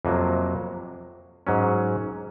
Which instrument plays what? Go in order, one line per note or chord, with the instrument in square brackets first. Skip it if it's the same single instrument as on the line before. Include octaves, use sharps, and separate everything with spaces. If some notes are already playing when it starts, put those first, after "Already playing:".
[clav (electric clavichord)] F2 C3 F#3 A#3
G#2 F#3 C#4